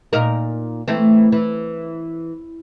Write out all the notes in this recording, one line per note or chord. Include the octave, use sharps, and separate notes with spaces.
A#2 D#4 A#4
E3 A3 C4
E3